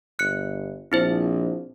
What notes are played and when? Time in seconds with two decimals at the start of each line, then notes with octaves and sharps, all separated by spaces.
0.19 G1 F#6 C#7
0.92 A#1 C4 E4 C5